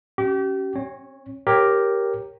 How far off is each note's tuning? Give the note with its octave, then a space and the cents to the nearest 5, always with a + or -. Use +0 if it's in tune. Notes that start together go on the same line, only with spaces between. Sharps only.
C#4 +0 G4 -35
C#4 -45 C#5 +0
G4 +0 A#4 +0 C#5 -15